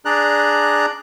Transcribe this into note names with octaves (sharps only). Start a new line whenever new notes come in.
D4 G#4 D5 A#5 F#6